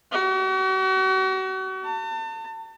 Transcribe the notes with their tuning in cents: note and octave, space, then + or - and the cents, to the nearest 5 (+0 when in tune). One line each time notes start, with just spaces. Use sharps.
F#4 +40
A5 +35